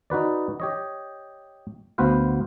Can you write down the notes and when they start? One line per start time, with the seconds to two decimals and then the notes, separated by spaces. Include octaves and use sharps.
0.10 D#4 F#4 B4 D5
0.60 G4 C#5 D#5
1.98 D2 B3 F#4 B4 C5 F5